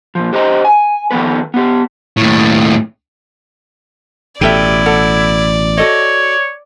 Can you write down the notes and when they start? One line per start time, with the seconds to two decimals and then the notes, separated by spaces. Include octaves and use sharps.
0.15 A#2 F3
0.33 G4 C5 D#5 A#5
0.65 G#5
1.11 D#3 F3 A3 B3 B4
1.54 B3 G4
2.17 D#2 A2
4.41 A1 B2 E4 G4 A4 D5 E5
4.86 A4 F#5
5.78 F#4 A4 C#5 D#5